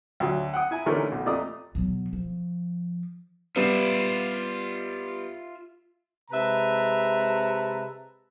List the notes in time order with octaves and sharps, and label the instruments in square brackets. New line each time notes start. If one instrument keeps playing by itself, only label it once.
[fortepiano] D2 F#3
F#5 G5 D#6
E4 G#5 A#5
D3 E3 A3 C#4 D#4 A#4
B1
F2 A3 D5 D#5 A#5 D#6
[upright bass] B2 F#3
F3
[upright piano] G3 B3 [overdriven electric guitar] F4 E5
[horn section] C3 G#3 B4 E5 A5 A#5